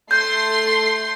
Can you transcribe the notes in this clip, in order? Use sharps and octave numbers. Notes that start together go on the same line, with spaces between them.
A3 C6 G6 C7